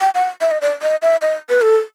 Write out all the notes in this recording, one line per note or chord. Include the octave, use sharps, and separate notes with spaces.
G5
F#5
E5
D#5
D5
D#5
E5
D#5
B4
A4